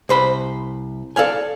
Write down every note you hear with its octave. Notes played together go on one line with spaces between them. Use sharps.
C2 C5 B5 C6
A4 D5 F5 G#5